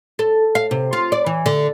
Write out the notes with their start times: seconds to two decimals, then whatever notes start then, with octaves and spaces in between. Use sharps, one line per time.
0.19 A4
0.55 F5
0.71 C3
0.93 F4
1.12 D5
1.26 E3
1.46 D3